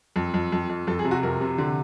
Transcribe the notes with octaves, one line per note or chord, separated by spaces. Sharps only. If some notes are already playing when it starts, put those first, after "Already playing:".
F2
F2
F2
F2
F2 A4
G#4
C3
F#4
F2 A#4
C3
D3